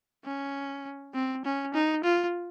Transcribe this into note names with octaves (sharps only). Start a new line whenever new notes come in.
C#4
C4
C#4
D#4
F4